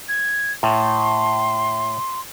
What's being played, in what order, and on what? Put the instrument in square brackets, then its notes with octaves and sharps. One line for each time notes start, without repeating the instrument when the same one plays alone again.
[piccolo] G#6
[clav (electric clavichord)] A2 [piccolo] C6